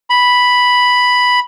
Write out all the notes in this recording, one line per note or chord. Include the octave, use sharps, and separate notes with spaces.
B5